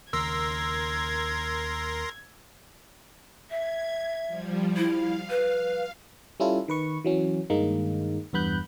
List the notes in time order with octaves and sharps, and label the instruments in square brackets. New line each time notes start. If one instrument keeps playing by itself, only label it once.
[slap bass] D#2 C#3 [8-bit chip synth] A#4 C6 A#6 [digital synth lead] E6 [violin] G#6
[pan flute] E5 [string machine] G#6
[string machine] F3 G3
[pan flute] E4 [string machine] F5
[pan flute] B4
[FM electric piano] G3 C#4 E4 F4 A4
D#3 B4 C#6
E3 F#3 C#4
G2 D#3 G#3 A#3 D#4
E2 G2 B3 B5 F#6 G6